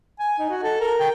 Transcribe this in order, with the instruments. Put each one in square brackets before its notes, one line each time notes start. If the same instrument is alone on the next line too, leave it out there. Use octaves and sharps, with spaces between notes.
[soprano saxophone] G#5
D#4
F#4
A4
A#4
G5